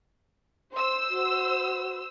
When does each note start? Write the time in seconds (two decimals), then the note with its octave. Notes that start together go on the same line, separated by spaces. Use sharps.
0.74 C5 C6 E6
1.10 F#4